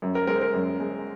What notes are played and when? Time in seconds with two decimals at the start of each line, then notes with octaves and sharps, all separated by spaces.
0.02 F#2
0.15 A#4
0.27 G#3 A#4
0.36 C5
0.41 A#4
0.54 F#2
0.80 G#3